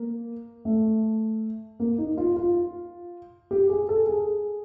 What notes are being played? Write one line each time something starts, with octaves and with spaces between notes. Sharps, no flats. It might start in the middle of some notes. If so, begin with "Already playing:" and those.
Already playing: A#3
A3
A#3
D#4
F4
F4
G4
G#4
A4
G#4